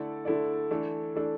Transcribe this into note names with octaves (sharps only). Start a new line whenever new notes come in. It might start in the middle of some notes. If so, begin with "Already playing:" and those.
Already playing: D3 A3 E4 A4 D5
D3 A3 E4 A4 D5
E3 A3 D4 A4
E3 A3 D4 A4